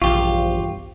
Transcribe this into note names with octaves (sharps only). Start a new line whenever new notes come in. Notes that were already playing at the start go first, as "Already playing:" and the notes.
E1 A#1 E2 G2 F4 G4 C#6